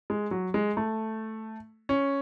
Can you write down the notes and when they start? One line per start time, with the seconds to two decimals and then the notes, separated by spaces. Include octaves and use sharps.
0.10 G#3
0.31 F#3
0.54 G#3
0.77 A3
1.89 C#4